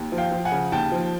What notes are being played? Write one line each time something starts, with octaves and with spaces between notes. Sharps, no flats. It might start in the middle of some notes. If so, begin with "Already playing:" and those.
Already playing: D#2
F3
F5 G5
F3
F#5 G#5
C#3
D#2 G5 A5
F3